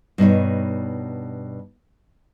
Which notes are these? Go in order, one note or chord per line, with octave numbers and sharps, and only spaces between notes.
G2 B2 D#4 C#5